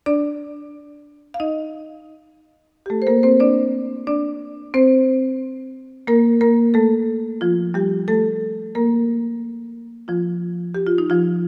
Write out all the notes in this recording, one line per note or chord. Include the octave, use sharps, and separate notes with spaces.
D4 D5
F5
D#4 D#5
G4
A3 A4
C5
A#3 A#4
C4 C5
D4 D5
D4 D5
C4 C5
A#3 A#4
A#3 A#4
A3 A4
F3 F4
G3 G4
A3 A4
A#3 A#4
F3 F4
G4
F4
D#4
F3 F4